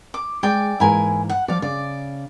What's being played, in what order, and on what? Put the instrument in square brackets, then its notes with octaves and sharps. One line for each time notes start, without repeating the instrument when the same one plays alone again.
[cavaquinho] D6
[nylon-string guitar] G#3 [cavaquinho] D5 G5 G#5
[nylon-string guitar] G#2 E3 A#3 [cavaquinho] E4 A#4 G#5
[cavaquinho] F#5
[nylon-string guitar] F3 F#5 [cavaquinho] D5 F5
[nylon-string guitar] C#3 [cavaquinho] D5